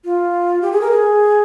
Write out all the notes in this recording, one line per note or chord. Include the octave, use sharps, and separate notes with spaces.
F4
G4
G#4
A#4
G#4